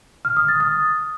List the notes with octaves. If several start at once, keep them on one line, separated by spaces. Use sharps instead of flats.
F6
D#6
A6
D#6